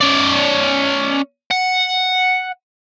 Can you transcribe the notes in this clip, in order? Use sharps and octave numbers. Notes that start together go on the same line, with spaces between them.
C#4 D5
F#5